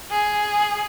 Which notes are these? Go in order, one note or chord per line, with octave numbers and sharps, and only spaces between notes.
G#4